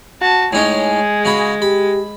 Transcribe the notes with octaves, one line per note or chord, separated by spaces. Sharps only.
F#4 A5
A2 G#3 C#4 D#4 G#4
C#3 F#4 B5
G4 B5